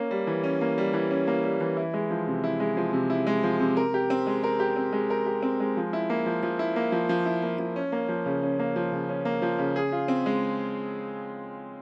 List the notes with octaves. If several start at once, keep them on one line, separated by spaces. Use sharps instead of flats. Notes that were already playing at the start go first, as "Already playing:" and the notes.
Already playing: A#3 C#4
G3
E3
C#4
A#3
G3
E3
C#4
A#3
G3
E3
E4
G#3
F3
C3
E4
G#3
F3
C3
E4
G#3
F3
C3
A#4
G4
C4
G#3
A#4
G4
C4
G#3
A#4
G4
C4
G#3
F3
E4
A#3
F3
F3
E4
A#3
F3
F3
E4
A#3
F3
C#4
A#3
F3
C#3
C#4
A#3
F3
C#3
C#4
A#3
F3
C#3
G#4
F4
C4
G#3